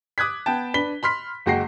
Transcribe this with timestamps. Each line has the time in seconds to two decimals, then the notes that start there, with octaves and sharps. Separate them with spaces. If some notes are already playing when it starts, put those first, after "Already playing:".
0.18 D6 D#6 F#6 G#6 B6
0.46 B3 G5 A5
0.74 D4 B4 B6 G7
1.03 B5 C6 F6 B6
1.46 F#1 G#3 F#4 G5 A#6 C7